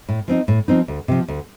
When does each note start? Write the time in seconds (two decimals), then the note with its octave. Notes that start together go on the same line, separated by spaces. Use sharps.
0.09 A2
0.28 F3 C4 D#4
0.48 A2
0.68 F3 C4 D#4
0.88 D2
1.08 C3 F3
1.28 D2